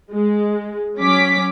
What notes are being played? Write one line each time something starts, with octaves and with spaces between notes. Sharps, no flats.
G#3
F#3 C#4 D6 B6